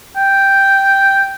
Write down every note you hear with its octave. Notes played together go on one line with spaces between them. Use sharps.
G5